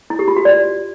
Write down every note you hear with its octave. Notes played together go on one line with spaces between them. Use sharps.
E4
G4
F4
F#4
D5